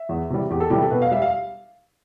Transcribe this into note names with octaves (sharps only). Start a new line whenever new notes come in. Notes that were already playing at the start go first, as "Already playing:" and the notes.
Already playing: E5
E2
C3 E3 G3
E2 G4
A4
C3 E3 G3 G4
A4
B2 B4
F5
G3 E5
F5